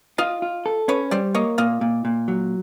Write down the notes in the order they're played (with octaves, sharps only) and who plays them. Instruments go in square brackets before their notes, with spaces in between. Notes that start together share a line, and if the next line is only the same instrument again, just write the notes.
[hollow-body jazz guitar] F4 [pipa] D#5 F5
[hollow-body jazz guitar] F4
A4
[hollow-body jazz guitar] C#4 [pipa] B4 C#5
[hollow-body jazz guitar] G3 [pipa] C5 D5
[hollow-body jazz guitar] A#3 [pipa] C#5 D#5
[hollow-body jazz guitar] A#2 [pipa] D#5 F5
[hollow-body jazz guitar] A#2
A#2
F#3